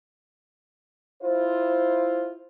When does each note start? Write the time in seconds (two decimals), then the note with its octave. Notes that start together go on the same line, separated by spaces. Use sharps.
1.23 E4 F4 C5